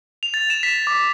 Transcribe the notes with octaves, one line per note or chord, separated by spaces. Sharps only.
F7
A6
E7
B6
D6